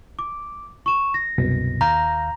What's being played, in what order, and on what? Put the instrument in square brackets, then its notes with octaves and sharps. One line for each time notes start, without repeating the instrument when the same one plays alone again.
[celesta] D6
C#6 E7
A#6
[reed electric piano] C2 F#2 B2
[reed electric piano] D#2 F5 G6 [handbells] A#5